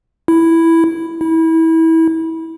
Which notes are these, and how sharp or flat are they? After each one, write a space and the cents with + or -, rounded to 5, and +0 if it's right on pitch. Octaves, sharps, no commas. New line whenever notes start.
E4 +0
E4 -25